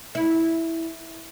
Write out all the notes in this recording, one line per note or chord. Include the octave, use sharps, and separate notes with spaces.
E4